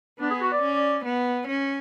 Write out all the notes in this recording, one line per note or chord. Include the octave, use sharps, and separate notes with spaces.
B3 D4
G#4
F#4
D5
C#4
B3
C#4